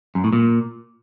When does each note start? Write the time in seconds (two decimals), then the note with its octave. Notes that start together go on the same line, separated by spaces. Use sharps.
0.15 F#2
0.24 A2
0.33 A#2